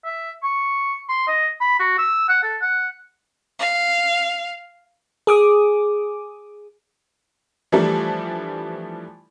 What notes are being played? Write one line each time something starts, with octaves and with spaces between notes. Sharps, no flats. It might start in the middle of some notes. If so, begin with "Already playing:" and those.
E5
C#6
C6
D#5
B5
F#4
E6
F#5
A4
F#5
F5
G#4 D6 D#6
E3 F3 G3 A3 D4 E4